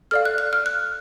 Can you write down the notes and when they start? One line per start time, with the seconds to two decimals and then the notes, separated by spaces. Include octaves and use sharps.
0.11 A4 D5 F5 F6
0.25 F#6
0.38 F#6
0.53 F6
0.66 F#6